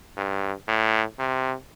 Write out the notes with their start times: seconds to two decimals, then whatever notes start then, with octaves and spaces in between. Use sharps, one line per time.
0.17 G2
0.68 A2
1.19 C3